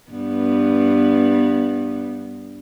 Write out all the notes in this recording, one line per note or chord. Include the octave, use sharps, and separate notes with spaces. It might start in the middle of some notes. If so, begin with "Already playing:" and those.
G2 B3